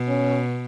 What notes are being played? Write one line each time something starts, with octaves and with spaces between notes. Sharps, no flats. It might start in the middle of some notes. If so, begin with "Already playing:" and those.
Already playing: B2
C#4